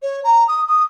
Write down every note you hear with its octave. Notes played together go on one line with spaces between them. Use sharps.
C#5
A#5
D#6
D#6